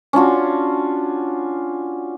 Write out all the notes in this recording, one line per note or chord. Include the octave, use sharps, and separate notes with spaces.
C#4 D4 F4 F#4